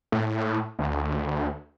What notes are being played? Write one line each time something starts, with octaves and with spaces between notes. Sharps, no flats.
A2
D2